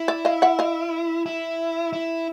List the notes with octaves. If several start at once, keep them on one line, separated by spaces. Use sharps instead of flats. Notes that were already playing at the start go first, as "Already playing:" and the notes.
Already playing: E4
D5 E5
D#5 F5
E5 F#5
D#5 F5
E4
E4